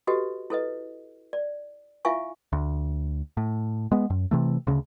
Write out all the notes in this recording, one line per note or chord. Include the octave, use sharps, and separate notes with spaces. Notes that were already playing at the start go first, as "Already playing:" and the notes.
F#4 G4 A4 B4 D#5
E4 A4 B4 D#5
D5
E4 F4 E5 F5 G#5 C#6
D2
A2
G#3 B3
F#2
C3 E3 A3
D2 C#3